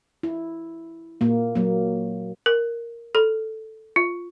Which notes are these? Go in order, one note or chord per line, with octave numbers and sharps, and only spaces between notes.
E4
A#2 A#3
F#3 A#3
A#4
A4
F4